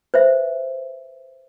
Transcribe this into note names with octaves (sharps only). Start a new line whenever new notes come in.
B4 C5 E5